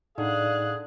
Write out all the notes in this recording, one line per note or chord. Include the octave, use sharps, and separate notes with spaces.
A2 D3 D#4 G#4 F5 F#6